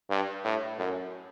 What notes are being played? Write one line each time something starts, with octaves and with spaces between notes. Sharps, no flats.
G2
A2
F#2